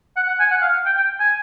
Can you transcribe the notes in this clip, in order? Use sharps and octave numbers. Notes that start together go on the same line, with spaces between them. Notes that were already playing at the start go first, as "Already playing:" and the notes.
F#5
F#5
G#5
F#5
F5
G5
G5
G#5